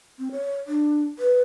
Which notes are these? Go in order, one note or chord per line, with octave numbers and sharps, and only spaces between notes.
C4
C#5
D4
B4